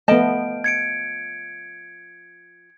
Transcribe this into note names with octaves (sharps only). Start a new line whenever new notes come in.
F3 A3 B3 D#5 A5 G6 D7
G#6 C#7 D7